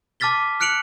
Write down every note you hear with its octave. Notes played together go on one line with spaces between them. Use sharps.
A5 D6 F6 A6 B6 G7
F6 F#6 C#7 D7 F7 F#7